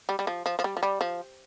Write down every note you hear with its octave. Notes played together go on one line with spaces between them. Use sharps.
G3
G3
F3
F3
F3
G3
F3
G3
F3